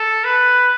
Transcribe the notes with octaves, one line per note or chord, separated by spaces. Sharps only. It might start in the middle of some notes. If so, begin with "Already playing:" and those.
Already playing: A4
B4